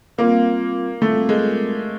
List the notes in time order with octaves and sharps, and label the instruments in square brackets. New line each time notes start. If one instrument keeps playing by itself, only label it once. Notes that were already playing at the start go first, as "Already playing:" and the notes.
[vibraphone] G3 C4 F4 [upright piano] A#3
[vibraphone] G3 C4 F4 [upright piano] A3
[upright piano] G#3